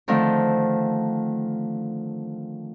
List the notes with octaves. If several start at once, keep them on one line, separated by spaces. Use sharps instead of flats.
D3 D#3 F3 A3 C4